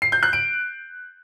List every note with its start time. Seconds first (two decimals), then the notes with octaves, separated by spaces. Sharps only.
0.02 C7
0.12 G6
0.23 F#6
0.33 D7